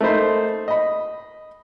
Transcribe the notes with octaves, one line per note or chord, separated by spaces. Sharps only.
A3 A#3 D#4 C5 B5
D#5 B5